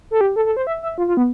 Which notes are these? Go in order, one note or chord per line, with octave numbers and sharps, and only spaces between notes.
A4
G4
A4
A4
C5
E5
E5
F4
F4
B3